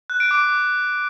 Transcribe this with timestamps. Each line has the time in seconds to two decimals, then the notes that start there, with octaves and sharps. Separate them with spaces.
0.10 F#6
0.20 D7
0.31 D6